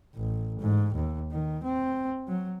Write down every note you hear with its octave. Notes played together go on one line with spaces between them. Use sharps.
A1
G#2
D#2
D#3
C4
F#3